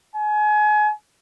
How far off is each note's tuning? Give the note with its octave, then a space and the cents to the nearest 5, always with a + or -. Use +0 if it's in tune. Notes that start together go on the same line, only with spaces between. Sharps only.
G#5 +30